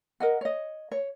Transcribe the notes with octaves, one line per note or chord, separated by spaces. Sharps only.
A#4 D#5 F#5
C#5 D#5
C#5